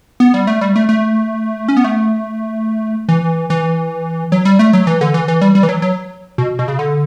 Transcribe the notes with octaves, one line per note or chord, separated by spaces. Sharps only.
B3
G3
A3
G3
A3
A3
C#4
B3
A3
E3
E3
F#3
G3
A3
F#3
E3
D3
E3
E3
G3
G3
E3
F#3
F#3
B2
B2
C#3
D3